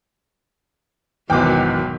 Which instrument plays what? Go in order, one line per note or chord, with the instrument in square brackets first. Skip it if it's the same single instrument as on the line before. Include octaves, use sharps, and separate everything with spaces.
[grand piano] G#1 E2 [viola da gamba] B2 D#3 F#3 [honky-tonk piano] G5 D6